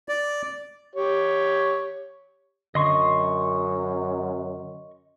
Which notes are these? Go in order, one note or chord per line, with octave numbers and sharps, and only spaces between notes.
D5
G4 C#5
F#2 D3 D#5 C6 C#6